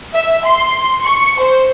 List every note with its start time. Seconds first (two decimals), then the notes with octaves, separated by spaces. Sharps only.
0.14 E5
0.44 C6
1.03 C#6
1.38 C5